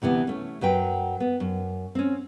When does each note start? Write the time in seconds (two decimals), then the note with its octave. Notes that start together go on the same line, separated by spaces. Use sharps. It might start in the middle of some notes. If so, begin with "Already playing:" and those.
0.02 D2 C3 E3 B3
0.27 A3 C#4
0.61 F#2 F#3 B4 G5
1.20 B3
1.40 F#2
1.95 C4 C#4